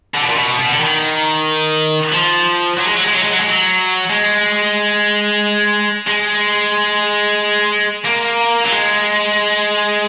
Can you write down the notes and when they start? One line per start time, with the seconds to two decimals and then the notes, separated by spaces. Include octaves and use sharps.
0.14 D3
0.21 B2
0.29 A#2
0.36 B2
0.59 B2
0.69 D3
0.80 D#3
2.12 F3
2.77 F#3
2.86 G#3
2.95 F#3
3.04 G#3
3.13 F#3
3.22 G#3
3.30 F#3
3.39 G#3
3.48 F#3
4.09 G#3
6.07 G#3
8.04 A#3
8.64 F#3
8.70 G#3